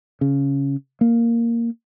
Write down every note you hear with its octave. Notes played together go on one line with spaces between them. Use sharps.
C#3
A#3